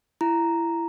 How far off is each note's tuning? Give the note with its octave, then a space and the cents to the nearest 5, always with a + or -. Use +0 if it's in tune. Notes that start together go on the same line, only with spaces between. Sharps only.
E4 +25 A#5 +0